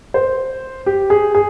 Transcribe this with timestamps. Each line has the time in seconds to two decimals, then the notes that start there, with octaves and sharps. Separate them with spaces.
0.14 C5
0.86 G4
1.10 G#4
1.35 G#4